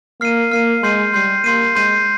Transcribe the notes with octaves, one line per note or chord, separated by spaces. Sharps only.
A#3 F6 C7 D#7
A#3 F6 C7 D#7
G#3 C6 G6 C7 D#7
G3 C6 G6 C7 D#7
A#3 C6 G6 C7 D#7
G#3 C6 G6 C7 D#7